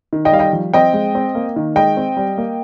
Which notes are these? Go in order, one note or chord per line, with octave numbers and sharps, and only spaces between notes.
D#3
D#5 G5
G3 F5
D#5 G5
F3
C4 D#5 G5
G#3
C4
A#3
D#3
G#3 D#5 G5
C4
G3
A#3